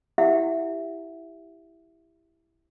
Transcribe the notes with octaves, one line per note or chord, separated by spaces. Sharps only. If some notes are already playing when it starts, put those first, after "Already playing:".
E4 G4 E5 F#5